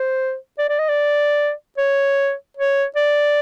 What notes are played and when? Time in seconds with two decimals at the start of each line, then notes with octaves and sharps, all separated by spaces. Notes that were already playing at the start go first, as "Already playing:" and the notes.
Already playing: C5
0.58 D5
0.69 D5
0.79 D#5
0.89 D5
1.78 C#5
2.57 C#5
2.96 D5